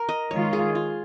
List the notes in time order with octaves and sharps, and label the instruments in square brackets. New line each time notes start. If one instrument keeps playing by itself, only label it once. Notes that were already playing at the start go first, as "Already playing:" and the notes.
Already playing: [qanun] A#4
D#5
[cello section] D#3 G#3 F4 [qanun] C#5
[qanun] G#4
F4